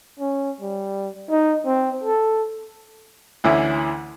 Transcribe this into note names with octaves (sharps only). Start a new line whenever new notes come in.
C#4
G3
D#4
C4
A4
D2 D3 E3 C#4 E4